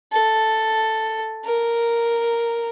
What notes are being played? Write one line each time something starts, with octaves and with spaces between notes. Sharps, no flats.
A4
A#4